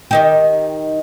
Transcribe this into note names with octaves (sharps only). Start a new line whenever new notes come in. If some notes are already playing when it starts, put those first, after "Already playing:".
D#3 D#4 G4